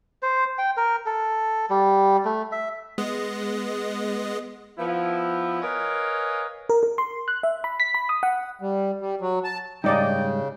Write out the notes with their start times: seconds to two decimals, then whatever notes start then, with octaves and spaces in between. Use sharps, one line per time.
0.23 C5
0.58 G5
0.77 A#4
1.06 A4
1.70 G3
2.25 A3
2.52 E5
2.98 G#3 B3 D#5
4.79 F3 B3 E4
5.62 A#4 B4 C#5 D#5 F5 G#5
6.69 A#4
6.83 A#4
6.98 C6
7.28 F#6
7.43 E5
7.64 B5
7.80 B6
7.94 B5
8.09 D#6
8.23 F#5
8.61 G3
9.01 G3
9.21 F#3
9.44 A5
9.84 G#2 C#3 G3 D#4 D5 D#5 G5